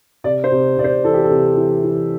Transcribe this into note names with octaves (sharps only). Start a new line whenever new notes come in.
C3 D5
C5
C3
C3 D5
C5
E3 A4
G4
A4
C3
E3
E3